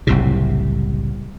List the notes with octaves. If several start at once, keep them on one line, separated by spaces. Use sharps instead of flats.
F#1 C2 A2 C3